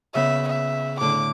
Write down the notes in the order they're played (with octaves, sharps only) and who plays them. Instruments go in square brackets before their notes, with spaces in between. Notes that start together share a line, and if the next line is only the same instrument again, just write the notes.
[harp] C#3 B3 [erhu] E5
[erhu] E5
[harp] A2 D3 [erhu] D6